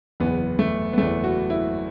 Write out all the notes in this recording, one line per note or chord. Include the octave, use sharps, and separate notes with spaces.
F#1 E2 E3 B3
A3
B3
F#1 E2 E3 A3
F#4
E4